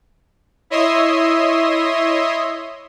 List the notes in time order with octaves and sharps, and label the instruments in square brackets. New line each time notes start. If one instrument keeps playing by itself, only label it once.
[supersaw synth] E4 C#5 D#5 E5 C6 D#6